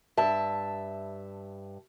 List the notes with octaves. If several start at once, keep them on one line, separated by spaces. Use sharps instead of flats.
G2 E5 A5